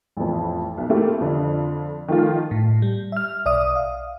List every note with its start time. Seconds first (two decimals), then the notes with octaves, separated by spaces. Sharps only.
0.17 A1 F2
0.77 B1
0.90 A3 A#3 C4 E4 G4
1.21 F2 D3
2.08 D#3 F3 A3 F4
2.51 A2
2.82 G3
3.12 E5 F6
3.45 B1 D5 E5 D#6
3.76 F5